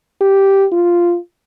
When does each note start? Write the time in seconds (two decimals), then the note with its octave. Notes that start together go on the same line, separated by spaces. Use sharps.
0.21 G4
0.72 F4